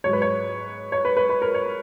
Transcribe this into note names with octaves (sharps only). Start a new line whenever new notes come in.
G#2 F#3 C#5
B4
C#5
C#5
B4
B4
B4
A#4
C#5